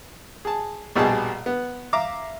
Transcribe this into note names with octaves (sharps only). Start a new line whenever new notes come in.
G#4 A5
A#1 B2 G3 G#4 A5
B3
E5 F5 A#5 D6